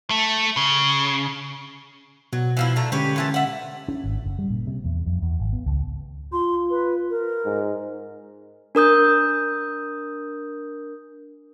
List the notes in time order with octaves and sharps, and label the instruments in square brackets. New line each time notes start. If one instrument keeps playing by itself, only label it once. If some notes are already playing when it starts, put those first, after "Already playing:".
[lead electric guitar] A3
C#3
[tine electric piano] B2 [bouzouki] F#3
[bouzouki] E3 F3 E4
D3 A3 A#5
[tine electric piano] D3 G#3 C#4 [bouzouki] G4 B4 C#5
[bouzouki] A#2 E3 A5
E5 F#5
[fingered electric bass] C#4
G#1
F#1
G3
A#2
C3
E2
F2
E2
G#1
B3
C#2
[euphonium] F4 [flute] C6
[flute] B4
A#4
[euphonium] G#2
[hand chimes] D4 A#4 D#6 G6